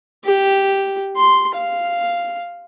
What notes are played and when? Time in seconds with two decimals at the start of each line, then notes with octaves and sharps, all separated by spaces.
0.24 G4
1.16 C6
1.55 F5